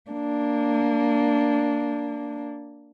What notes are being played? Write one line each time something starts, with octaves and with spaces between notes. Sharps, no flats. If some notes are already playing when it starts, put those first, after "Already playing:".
A#3 D4